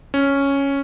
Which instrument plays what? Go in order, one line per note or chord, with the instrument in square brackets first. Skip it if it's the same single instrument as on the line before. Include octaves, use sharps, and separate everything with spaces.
[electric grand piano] C#4